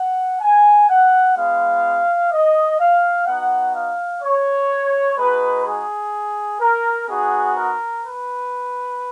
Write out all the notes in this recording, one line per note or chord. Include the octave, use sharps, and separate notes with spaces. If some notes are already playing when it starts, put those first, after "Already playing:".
Already playing: F#5
G#5
F#5
G#3 B3 F4 F5
D#5
F5
B3 D#4 F#4 F#5
F5
C#5
G#3 D#4 F#4 B4
G#4
A#4
B3 D#4 F#4 G#4
A#4
B4